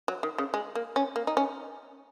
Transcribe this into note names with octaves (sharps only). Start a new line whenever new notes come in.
F#3
D#3
C#3
G#3
A#3
C#4
A#3
D#4
C#4